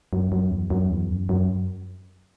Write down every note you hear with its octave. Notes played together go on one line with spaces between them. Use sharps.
F#2
F#2
E2
F#2
E2
F#2
F#2